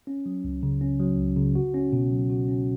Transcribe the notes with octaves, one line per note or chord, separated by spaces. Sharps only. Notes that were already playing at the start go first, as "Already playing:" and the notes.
C#4
F#3
C#2
C#3
C#4
F#3
C#2
C#3
F#4
C#4
B2
F#3
F#4
C#4